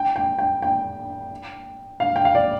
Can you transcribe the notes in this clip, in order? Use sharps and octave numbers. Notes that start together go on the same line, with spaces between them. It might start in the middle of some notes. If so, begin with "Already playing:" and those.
Already playing: G5
G5
G5
G5
F5
G5
F5
D5